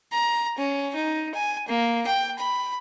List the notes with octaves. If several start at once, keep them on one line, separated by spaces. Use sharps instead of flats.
A#5
C#4
D#4
G#5
A#3
G5
B5